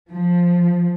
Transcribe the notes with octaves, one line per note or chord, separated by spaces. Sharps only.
F3